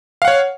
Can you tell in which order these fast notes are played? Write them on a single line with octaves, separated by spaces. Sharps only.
F5 F#5 C#5